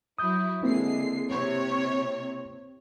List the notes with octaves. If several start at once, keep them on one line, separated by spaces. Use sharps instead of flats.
F#3 E4 D#6 G6
D3 G#3 A#3 C4 E4 C7
C3 C#5